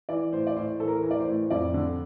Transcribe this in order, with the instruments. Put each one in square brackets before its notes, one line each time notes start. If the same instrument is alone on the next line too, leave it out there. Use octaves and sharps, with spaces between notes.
[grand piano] E3 D5
A2 C5
D5
A2 C5
E3 A4
A#4
E3
D5
C5
A2
F2 D5
D3